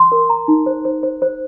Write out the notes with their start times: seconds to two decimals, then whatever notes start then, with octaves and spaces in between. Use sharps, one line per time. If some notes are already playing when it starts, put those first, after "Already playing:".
Already playing: C6
0.12 A#4
0.30 A#5
0.48 D#4
0.66 C5
0.85 C5
1.03 C5
1.22 C5